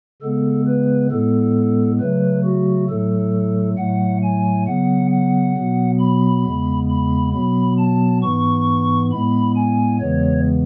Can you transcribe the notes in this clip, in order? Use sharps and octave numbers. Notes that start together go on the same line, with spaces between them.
C#3 G#3 B3 A4
B4
A2 G#3 B3 A4
C#3 F#3 A3 B4
F#4
A2 F#3 A3 A4
A2 F#3 A3 F#5
G#5
C#3 F#3 B3 F#5
F#5
B2 F#3 B3
B5
E2 C#3 G#3 B3
B5
B2 F#3 B3 B5
A5
G#2 E3 B3 C#6
A2 G#3 B3 B5
G#5
E2 C#3 E3 G#3 B3 C#5